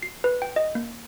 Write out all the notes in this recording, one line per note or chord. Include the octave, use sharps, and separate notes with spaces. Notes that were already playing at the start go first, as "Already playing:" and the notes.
C7
B4
G5
D#5
A#3